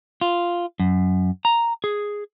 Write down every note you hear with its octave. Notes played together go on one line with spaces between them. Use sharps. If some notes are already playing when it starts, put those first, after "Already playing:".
F4
F#2
A#5
G#4